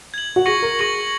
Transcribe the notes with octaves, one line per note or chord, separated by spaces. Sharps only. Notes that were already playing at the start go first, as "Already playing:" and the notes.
G#6 F#7
F#4
G#4 C#6 A#6 C#7 F#7
A#4
G#4 C#6 A#6 F#7